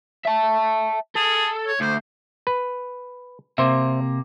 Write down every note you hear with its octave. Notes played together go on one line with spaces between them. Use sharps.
E5 A5
G#4 A4
C#5
D2 C5
B4
C3 A#3 C5 E5